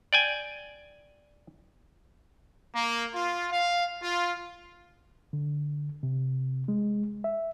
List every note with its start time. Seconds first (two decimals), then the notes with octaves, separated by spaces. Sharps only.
0.13 D5 G5 G#5
2.74 A#3
3.14 F4
3.51 F5
4.02 F4
5.33 D3
6.03 C3
6.68 G#3
7.24 E5